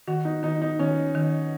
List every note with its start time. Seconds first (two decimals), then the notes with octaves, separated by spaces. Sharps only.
0.07 D#3 F#4
0.25 D#4
0.43 D#3 D#4
0.62 D#4
0.79 D#3 C#4
1.15 D#3